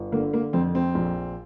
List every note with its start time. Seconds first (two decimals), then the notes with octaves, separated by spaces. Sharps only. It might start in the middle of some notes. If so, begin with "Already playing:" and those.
Already playing: G1
0.12 D3 A#3
0.33 A#3
0.53 F2 C4
0.75 C4
0.95 A#1